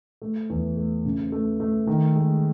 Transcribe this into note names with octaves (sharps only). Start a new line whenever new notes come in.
A3
E2
A3
C#3
A3
A3
D#3
G#3